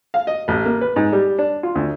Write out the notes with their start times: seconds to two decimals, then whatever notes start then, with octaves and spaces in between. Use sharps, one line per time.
0.14 F5
0.27 D#5
0.48 A1
0.65 A#3
0.81 B4
0.96 G#2
1.12 G3
1.38 D4
1.63 F4
1.75 D2